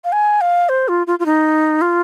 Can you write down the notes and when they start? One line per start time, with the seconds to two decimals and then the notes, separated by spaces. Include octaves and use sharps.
0.04 F5
0.12 G#5
0.41 F5
0.69 C5
0.88 F4
1.07 F4
1.19 F4
1.26 D#4
1.81 F4